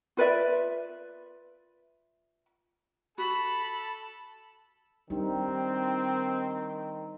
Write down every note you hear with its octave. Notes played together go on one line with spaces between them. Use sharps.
F4 B4 D5 E5
F#4 A4 A5 B5
D#3 G3 C4 D4 D#4